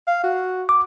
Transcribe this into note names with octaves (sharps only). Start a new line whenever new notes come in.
F5
F#4
D6